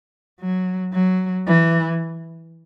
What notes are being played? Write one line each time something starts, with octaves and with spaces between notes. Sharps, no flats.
F#3
F#3
E3